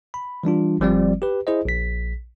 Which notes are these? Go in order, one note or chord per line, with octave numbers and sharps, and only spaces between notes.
B5
E3 G3 D4 F4
G1 F3 G3 C4 D5
G4 B4
E4 G#4 C5 D#5
A#1 B6